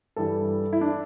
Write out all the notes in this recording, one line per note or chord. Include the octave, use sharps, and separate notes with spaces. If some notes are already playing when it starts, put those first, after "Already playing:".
G2 E3 G3 A4
E4
D4